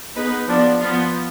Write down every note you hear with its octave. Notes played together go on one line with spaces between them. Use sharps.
B3 D#4 G#4 B4
F3 B3 D4
F3 B3 F4